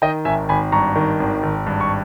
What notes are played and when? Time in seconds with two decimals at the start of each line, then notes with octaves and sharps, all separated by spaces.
0.02 D#3 D#5 G5
0.25 G#1 E5 G#5
0.49 G#1 G#5 B5
0.72 G2 A#5 C#6
0.96 D#3
1.20 G#1
1.43 G#1
1.66 G2
1.81 C#6